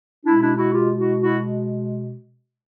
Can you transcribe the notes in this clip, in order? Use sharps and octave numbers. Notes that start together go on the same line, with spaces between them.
B2 G#3 D4 E4
D4 E4
E4 F#4
F4 G4
E4 F#4
E4 F#4